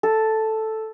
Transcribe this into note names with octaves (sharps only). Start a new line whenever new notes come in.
A4